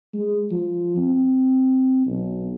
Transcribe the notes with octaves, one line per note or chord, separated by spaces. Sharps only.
G#3
F3
C4
B1